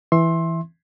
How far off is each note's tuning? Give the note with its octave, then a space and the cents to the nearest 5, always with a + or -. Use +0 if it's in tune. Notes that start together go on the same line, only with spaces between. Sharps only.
E3 +0 E5 +0 C6 +20